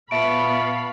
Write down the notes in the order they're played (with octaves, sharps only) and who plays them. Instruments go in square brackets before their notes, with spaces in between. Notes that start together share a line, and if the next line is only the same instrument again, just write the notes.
[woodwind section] A#2 A5 C#6 [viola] B3 [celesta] E5 D7 [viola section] F5 B5